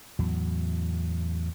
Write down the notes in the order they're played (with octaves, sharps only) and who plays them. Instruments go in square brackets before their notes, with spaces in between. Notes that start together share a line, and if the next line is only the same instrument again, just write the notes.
[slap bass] E2 A2 F#3